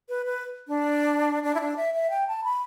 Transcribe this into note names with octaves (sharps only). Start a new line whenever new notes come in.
B4
B4
D4
D4
E4
D4
E5
E5
G5
A5
B5